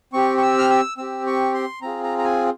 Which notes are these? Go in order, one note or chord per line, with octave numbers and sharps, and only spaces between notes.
C4 G4 C#6
C#6
E6
F6
E6
C4 G4 E6
C#6
C6
C4 F4 G#4 A#5
A#5
A#5
G#5